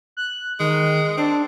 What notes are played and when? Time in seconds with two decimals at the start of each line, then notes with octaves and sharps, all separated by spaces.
0.17 F#6
0.60 D#3 G#3
1.18 C4 D4